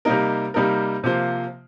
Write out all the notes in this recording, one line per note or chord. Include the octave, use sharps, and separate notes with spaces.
C3 G3 A#3 D#4 A#4
C3 G3 A#3 D#4 A#4
C3 F3 A#3 F4 C5